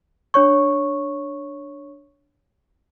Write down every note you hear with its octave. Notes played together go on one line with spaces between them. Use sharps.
D4 C#5 C#6